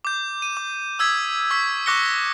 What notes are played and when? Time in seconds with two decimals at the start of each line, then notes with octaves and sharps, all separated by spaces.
0.05 D6 G6
0.42 D#7
0.57 D6
0.99 D#6 E6 G#6 B6
1.50 C#6 E6 B6
1.86 C#6 D6 F#6 A#6 C#7 G7